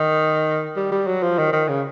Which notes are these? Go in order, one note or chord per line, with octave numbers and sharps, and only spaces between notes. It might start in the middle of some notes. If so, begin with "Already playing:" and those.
Already playing: D#3
G3
G3
F#3
F3
D#3
D#3
C#3